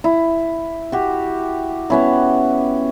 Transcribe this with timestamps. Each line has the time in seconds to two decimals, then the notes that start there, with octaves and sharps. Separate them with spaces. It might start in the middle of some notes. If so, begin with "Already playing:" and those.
0.04 E4
0.92 F#4 G4
1.90 B3 C#4 E4